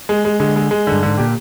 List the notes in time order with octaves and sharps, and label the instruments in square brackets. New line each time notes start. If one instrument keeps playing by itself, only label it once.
[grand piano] G#3
G#3
[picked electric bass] D3 [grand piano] G#3
[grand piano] G#3
G#3
D3
[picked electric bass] G2
[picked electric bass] G#2 [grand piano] D3
[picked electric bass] A#2 [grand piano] G4